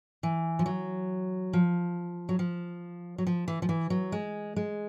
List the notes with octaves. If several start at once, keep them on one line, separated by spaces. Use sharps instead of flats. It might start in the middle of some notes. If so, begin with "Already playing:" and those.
E3
F3
F#3
F3
F#3
F3
F#3
F3
E3
F3
E3
F#3
G#3
G#3